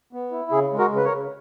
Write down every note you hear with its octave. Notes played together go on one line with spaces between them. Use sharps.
B3
E4
C#3 G#4
G#3
F#4 A#4
C#3
B4
A#4 C#5
C#3